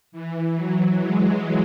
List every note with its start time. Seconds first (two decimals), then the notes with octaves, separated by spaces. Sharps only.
0.12 E3
0.56 F#3
1.00 G#3
1.29 G#3